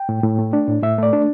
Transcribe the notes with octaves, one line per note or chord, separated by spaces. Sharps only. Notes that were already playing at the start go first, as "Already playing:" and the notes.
Already playing: G5
A2
A2
A3
D4
A2
A2 E5
A3 D5
D4